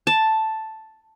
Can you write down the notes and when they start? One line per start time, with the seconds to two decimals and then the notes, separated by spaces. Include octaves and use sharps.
0.07 A5